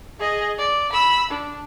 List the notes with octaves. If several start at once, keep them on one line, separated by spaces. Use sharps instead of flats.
G#4 D#5
D5
B5 E6
D4